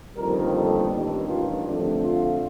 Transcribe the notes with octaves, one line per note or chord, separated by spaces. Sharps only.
G1 F2 D#3 G3 A#3 A#4
A4
A1 G2 D#3
F4
F2 D3 A3 D4
F4